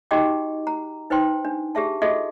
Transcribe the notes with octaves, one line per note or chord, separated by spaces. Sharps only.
D#4 F#4 G4 D#5 G5 D6
A#5
D#4 B4 C5 G5 C6
D4
G4 G#4 E5 A5
F4 F#4 G#4 A4 D#5 E5